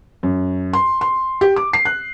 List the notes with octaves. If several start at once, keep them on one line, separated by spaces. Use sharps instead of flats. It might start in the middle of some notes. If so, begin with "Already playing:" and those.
F#2
C6
C6
G4
D6
C7
F#6